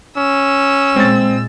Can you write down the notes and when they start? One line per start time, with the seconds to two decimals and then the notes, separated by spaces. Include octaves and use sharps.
0.17 C#4 E6
0.96 A#2 G#3 C4 A6